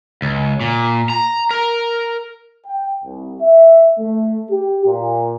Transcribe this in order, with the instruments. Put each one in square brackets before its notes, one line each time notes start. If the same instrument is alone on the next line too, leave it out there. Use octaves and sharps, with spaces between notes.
[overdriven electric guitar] C#2
A#2
A#5
A#4
[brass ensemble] G5
C2
E5
A3
G4
A#2